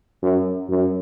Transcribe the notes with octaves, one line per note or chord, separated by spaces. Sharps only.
F#2
F#2